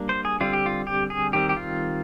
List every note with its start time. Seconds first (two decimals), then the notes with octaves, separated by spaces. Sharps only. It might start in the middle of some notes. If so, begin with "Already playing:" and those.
Already playing: G3 A#3 D4
0.09 C5
0.25 G#4
0.40 D3 G3 C4 F4
0.53 G4
0.66 F4
0.87 G4
1.10 G#4
1.33 D#3 G3 C4 G4
1.49 G4
1.57 F4